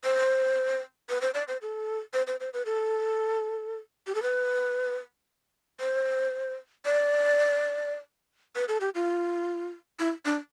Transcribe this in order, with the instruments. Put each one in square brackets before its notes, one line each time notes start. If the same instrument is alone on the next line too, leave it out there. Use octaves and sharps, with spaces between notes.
[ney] C5
B4
C5
D5
C5
A4
C5
C5
C5
B4
A4
G4
A4
B4
C5
D5
B4
A4
G4
F4
E4
D4